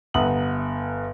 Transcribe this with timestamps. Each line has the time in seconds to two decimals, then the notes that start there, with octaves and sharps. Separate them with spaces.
0.14 G1 E5 F#5 A#5 D#6 F#7